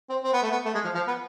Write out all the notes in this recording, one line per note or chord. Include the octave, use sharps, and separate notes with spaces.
C4
C4
B3
A3
B3
A3
G#3
F3
F3
B3